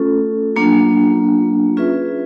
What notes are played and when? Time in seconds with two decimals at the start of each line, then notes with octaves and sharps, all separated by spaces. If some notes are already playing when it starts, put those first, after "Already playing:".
Already playing: A3 C#4 F4 A4
0.56 F#3 A#3 D4 F4
1.77 C#4 F4 G#4 B4 E5